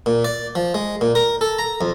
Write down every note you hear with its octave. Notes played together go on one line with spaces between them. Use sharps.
A#2
D5
F3
G#3
A#2
A#4
A4
A#5
F2